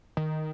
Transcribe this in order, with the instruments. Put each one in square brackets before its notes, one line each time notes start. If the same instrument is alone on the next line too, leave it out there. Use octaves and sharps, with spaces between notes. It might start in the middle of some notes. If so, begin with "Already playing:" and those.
[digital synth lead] D#3